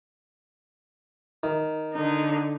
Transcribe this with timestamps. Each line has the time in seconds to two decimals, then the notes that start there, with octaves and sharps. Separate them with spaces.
1.43 D#3
1.93 D3 D#4